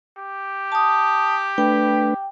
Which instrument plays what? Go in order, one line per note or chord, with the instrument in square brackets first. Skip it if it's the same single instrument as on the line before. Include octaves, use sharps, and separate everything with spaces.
[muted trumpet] G4
[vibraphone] A5 D#6
[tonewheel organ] A3 D4 B4 [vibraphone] G5